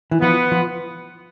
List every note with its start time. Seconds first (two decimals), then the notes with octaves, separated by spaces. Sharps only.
0.11 E3
0.21 F3 B3
0.52 F3